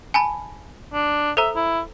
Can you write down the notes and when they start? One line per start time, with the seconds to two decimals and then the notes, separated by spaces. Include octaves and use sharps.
0.14 G#5 A5 B5
0.94 D4
1.37 A4 C5 E5 A#5
1.56 E4